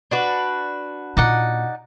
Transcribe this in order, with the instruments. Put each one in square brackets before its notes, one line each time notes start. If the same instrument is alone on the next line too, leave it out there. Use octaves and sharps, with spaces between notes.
[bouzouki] D4 F#4 B4
[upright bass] A#2 [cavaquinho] D#4 D5 F#5